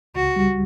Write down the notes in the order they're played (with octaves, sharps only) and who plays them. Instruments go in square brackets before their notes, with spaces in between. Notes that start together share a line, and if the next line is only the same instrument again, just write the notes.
[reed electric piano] C#2 [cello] F#4
[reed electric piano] G3